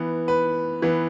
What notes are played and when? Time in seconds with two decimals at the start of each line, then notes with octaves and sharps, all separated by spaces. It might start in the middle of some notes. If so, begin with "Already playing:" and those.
Already playing: E3 B3
0.28 B4
0.82 E3 B3